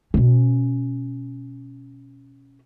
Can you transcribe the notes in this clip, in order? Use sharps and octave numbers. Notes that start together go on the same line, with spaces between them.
B2 C#4